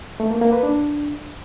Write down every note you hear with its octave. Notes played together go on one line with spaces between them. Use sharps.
A3
A#3
A#3
B4
D4